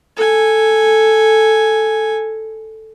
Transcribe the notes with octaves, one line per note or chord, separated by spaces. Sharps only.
A4 G#5